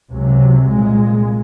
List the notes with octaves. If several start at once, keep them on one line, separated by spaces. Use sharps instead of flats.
C#2 C3 F#3
C2 A#2 G#3